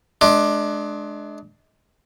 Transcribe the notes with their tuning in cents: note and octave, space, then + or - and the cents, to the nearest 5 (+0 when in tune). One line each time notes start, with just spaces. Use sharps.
G#3 +35 D4 +10